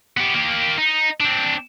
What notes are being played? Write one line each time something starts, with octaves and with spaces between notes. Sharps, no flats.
B3 G4
A#3 G4
D#4
C4 D4